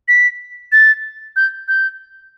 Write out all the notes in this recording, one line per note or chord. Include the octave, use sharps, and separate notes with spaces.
B6
A6
G6
G6